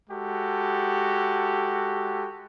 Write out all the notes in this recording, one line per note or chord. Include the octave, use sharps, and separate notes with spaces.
G#3 F#4 G4 A4